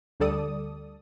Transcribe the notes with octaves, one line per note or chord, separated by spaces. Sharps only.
D2 D3 G3 A4 D5 D#6